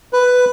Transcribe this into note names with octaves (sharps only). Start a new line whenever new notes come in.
B4